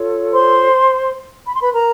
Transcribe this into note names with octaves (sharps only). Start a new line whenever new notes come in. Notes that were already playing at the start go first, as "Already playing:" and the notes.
Already playing: F4 A4 C#5
C5 C6
B5
C6
B4 B5
A#4 A#5